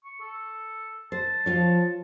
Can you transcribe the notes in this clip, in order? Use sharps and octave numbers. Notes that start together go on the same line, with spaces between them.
C#6
A4
C5 A5
F3 F4 C#5